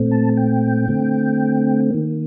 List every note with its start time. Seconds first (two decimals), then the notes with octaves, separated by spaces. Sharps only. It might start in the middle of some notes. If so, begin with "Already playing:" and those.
Already playing: A#2 A3 C4
0.11 A5
0.37 G5
0.88 D3 A3 C4
1.91 D#3 A#3